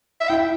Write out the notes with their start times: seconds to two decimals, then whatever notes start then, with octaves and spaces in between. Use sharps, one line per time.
0.21 E5
0.29 E4 G5